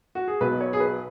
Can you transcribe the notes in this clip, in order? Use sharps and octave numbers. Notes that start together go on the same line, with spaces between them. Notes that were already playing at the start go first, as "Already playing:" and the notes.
F#4
G#4
B1 B2 F#3 B4
C#5
G#4
B4